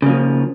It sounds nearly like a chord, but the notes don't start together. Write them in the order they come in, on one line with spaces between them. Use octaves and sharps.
C#3 A#3 F3